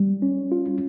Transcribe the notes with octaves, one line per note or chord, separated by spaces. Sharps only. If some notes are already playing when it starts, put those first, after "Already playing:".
Already playing: G3
C#4
F4